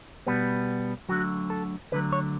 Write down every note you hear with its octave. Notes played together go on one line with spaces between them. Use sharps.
B2 G3 B3
D2 D3 F#3 F#4
A4
D2 D3 F#3 B4
C#5